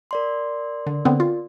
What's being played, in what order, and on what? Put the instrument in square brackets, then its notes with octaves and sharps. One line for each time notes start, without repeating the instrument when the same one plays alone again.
[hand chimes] A#4 D5 C6
[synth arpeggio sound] D3
D3 B3 C4
F4